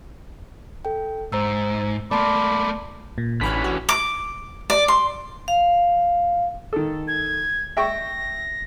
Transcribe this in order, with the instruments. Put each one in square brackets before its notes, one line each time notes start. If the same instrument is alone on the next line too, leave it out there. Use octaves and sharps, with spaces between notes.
[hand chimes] A4 G5
[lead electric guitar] G#2 [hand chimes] C5 A#5 E6
[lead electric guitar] A3 A#3 [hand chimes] D5 A5 C6 [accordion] B5 D6
[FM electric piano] A#2
[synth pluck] A1 B5 F#6 [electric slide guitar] D3 E3 C#4 [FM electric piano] B6
[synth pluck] F#4
[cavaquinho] D6
D5
C6
[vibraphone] F5
[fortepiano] D#3 A4
[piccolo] G#6
[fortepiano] E5 G5 C#6 [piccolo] A#6